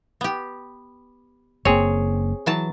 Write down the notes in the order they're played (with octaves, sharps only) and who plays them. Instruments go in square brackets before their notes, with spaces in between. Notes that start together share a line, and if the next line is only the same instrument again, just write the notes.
[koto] B3 G4
[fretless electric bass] F#1 A#3 [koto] C4 [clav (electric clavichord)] G#4 C#5
[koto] E3 F#3 A5